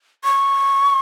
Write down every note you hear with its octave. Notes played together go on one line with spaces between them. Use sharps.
C#6